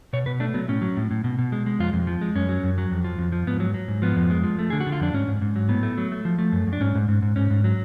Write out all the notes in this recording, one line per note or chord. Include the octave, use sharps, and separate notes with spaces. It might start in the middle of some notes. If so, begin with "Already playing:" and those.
B2 C#5
B2 B4
A3 D4
F#3 B3
A2 C#4
F#3
A2
A2
B2
B2
G#3
G#3
F2 F4
F2
F3
G#3
F#2 C#4
F#3
F#2
F#3
F2
F3
F2
F3
G#2 B3
F#3
F#3
G#2
F3 B3
F2
G#3
F3
A3
D3 G#4
F#4
D3
F4
F2 D4
G#2 C#4
G#2
G#2
F#3
A2 B3
A3
F#3
A3
F3
A3
F#2
F#2
D4
G#2 C#4
G#2
G#2
G#2
G#2 C#4
G#2
F#3